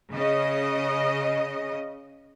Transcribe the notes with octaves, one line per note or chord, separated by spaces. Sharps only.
C#3 D#5